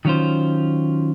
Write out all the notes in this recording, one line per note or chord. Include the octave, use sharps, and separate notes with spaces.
D#3 F#3 C#4 F4 C5